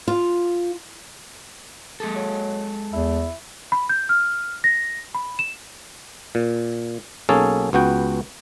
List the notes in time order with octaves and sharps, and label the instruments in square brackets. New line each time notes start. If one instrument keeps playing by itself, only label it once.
[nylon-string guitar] F4
[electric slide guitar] G#3 G#4 A4
[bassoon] F#3
[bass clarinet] E2 [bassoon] E4
[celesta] B5
G6
F6
A#6
B5
E7
[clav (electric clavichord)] A#2
B1 A#3 C#4 G#4 A4
C#2 B3 F#4 G5